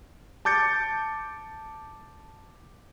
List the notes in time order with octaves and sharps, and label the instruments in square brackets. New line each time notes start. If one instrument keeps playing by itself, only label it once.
[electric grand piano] A5 D6 G6 A6 C#7